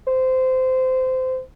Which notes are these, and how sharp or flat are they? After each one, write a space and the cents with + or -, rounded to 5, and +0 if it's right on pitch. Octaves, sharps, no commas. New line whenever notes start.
C5 -20